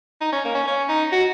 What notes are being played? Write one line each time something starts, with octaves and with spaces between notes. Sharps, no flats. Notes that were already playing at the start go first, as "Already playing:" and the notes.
D#4
C#4
A#3
C#4
C#4
D#4
F#4